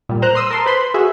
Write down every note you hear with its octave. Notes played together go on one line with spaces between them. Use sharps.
A#2 G3
A#4 C5 A#5 F#6
C6 D#6 E6
A#4 A5 C6
B4 C5 B5 C6
F#4 G#4 E5